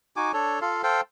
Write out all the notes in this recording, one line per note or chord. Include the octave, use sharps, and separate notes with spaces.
D#4 F#4 G#5 D6
D4 A4 C#5
F4 A4 F5
A4 C5 F5 G5